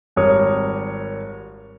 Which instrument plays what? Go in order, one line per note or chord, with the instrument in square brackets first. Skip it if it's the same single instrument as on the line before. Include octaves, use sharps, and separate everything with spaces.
[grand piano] G#1 G3 A#4 C#5 D#6